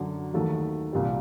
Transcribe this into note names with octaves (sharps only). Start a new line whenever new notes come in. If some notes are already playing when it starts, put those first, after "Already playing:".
Already playing: F#2 D3 F#3
D#2 D#3 F#3 A3
C2 A#2 G3